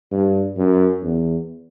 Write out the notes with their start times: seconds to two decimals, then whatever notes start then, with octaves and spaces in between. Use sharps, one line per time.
0.12 G2
0.57 F#2
1.04 E2